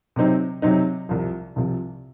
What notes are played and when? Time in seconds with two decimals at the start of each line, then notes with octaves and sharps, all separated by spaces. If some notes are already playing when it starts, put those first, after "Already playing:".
0.16 C3 F#3 C4 D#4
0.62 C3 F#3 C4 D#4
1.09 C2 C3 F3
1.56 C2 C3 F3